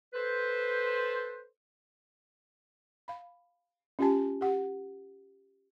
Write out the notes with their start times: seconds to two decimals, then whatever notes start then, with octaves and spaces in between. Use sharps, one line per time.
0.14 A4 B4 C5
3.08 F5 B5
3.99 C#4 F4 G4 G#5 A5
4.41 G4 F#5